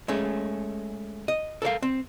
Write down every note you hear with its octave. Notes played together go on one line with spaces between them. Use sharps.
G#3 A3 C#4
D#5
A4 A#4 C#5 F5
C4